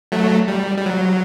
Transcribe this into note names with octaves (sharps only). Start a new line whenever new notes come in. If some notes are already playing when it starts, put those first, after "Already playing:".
F#3 A3
G3
G3
F#3